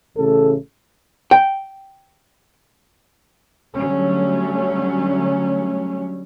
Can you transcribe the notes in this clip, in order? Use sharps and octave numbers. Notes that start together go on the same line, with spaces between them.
A1 C#3 A3 A4
G5
D3 F#3 G3 A3 C#4